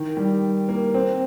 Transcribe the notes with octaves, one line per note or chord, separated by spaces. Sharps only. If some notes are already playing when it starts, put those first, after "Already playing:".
Already playing: D#3
G3
A#3
C4